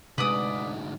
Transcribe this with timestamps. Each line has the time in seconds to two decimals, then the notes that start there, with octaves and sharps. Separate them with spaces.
0.18 D2 G#2 C3 G#3 B4 D5 D#6